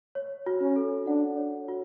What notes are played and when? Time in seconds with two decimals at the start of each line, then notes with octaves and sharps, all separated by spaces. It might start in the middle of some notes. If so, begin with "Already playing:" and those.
0.15 C#5
0.46 F#4
0.61 C#4
0.76 A4
1.06 D4 F#5
1.37 C#5
1.68 F#4